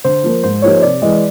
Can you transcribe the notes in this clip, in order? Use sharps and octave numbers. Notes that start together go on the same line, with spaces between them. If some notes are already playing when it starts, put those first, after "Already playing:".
D3 C5
F3 A#3
G#2 C5
F3 A#3 D#4 G4 C#5
C3 D5
E3 G#3 D#5